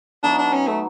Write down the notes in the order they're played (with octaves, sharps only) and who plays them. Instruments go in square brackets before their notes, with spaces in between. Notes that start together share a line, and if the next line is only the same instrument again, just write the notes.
[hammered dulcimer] F#3 B3 D#4 [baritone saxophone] D4
[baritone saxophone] D4
C#4
A3